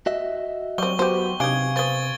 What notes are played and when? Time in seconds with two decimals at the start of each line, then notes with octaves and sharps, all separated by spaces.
0.06 F#4 D#5 E5
0.78 F#3 G3 C4 C#6 G7
0.99 B3 F#4 G4 C5
1.40 C3 D4 D#4 F5 G#5 G#6 D7 G7
1.76 B3 C4 C#6 A6 G7